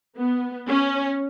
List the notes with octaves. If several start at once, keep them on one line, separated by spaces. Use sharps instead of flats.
B3
C#4